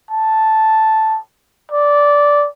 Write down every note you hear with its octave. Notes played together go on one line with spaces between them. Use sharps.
A5
D5